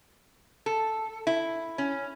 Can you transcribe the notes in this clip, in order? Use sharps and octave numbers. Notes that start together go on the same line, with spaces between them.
A4
E4
C#4